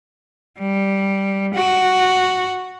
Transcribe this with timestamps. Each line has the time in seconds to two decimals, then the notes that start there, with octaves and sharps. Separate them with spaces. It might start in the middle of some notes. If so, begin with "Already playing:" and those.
0.59 G3
1.55 F#4